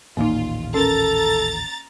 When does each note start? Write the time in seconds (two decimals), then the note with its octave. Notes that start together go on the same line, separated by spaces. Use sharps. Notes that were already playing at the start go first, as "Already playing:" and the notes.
0.17 A1 D#2 A#2 A#3 D#4 F4
0.74 C#4 A4 A#4 A#5 A6